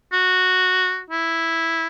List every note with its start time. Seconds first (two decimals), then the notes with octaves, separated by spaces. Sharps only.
0.13 F#4
1.11 E4